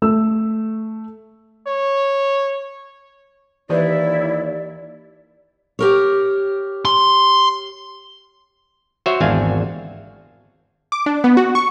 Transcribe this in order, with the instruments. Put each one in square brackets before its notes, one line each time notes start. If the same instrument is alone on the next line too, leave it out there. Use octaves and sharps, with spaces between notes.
[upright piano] A3 E6
[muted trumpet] C#5
[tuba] D#2 [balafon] E3 G4 B4 [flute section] E4 [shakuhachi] D5
[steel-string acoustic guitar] G4 A#4 C#5
[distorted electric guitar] C6
[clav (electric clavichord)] F#4 C5 C#5 E5
G#1 E2 C4 D4 F5 G#5
[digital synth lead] D6
D4
B3
F#4
C#6